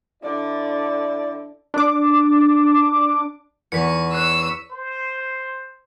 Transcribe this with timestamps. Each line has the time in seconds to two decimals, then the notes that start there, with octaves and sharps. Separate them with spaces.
0.23 D3 E4 D5
1.74 D4 D6
3.72 E2 C#6 B6 C#7
4.13 C#5 E6 F#6 C7
4.71 C5